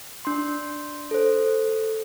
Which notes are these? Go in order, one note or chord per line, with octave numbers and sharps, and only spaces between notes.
D4 C6
A4 C5